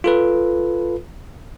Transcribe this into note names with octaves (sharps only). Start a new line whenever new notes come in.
F4 A4 B4